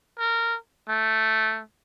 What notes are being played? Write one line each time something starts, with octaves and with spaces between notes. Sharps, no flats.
A#4
A3